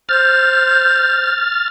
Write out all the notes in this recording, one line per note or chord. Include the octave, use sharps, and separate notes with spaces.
C5 F6 G6 A6